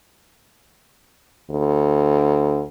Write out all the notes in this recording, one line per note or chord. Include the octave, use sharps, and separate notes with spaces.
D2